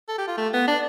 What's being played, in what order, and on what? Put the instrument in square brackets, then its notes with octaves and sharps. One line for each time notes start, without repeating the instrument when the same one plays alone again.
[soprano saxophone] A4
G4
F4
A3
B3
D4